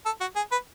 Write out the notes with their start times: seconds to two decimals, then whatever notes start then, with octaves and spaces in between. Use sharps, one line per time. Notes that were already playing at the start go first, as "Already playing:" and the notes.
0.05 A4
0.20 F#4
0.36 G#4
0.51 B4